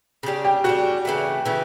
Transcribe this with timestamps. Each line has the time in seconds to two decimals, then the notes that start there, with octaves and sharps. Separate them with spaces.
0.23 C#3 G3 D4
0.45 G4
0.64 C#3 G3 D4 F#4
1.05 C#3 E3 A3
1.46 C#3 E3 A3